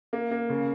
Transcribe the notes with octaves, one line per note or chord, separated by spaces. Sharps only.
A#3
A#3
C#3